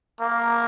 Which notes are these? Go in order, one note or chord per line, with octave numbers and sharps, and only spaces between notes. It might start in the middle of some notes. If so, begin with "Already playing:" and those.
A#3